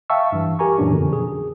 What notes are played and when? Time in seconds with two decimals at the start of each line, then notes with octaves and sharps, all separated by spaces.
0.10 E5 F5 G5 A5 C#6 E6
0.32 G2 E3
0.59 G4 A#4 G#5 A#5 C#6
0.78 F#2 A#2 E3 C#4 D4
0.91 F2 B2 D3 F3
1.13 G#4